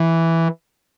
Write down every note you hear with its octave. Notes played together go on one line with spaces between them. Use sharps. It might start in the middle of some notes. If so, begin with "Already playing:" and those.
Already playing: E3